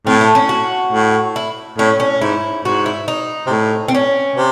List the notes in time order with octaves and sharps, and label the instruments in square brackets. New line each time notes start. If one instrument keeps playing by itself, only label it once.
[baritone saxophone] A2 [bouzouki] C4
[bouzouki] A3
C#4
F#4
[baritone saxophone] A2
[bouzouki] E4
[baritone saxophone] A2 [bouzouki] C#4
[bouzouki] C#4
[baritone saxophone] G#2 [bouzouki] E4
[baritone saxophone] G#2 [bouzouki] F#4
[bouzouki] E4
D#4
[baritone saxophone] C3
A2
[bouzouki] C4
C#4
[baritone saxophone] C3